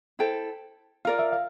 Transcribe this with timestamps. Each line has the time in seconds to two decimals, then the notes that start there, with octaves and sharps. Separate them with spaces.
0.19 E4 A4 C5 G5
1.05 F4 A#4 D5 F5
1.19 E5
1.32 F5